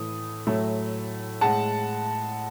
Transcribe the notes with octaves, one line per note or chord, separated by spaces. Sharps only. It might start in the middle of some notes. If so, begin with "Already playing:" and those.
Already playing: A2 E3 A3 D#6
A2 F#3 A3
A2 G#3 F#5 A5